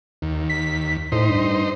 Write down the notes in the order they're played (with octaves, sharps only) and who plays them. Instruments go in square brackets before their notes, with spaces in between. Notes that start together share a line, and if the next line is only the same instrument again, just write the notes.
[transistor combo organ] D#2
[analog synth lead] B6
[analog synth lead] A2 [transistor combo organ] D#4 C5
[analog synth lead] G2